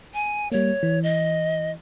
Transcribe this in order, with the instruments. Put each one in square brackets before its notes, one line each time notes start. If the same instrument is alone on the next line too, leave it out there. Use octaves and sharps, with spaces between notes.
[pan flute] G#5
[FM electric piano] G3 A#3 [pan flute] C#5
[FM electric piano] E3
[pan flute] D#5